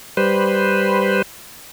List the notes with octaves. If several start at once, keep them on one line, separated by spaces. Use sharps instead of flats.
G3 B4 C5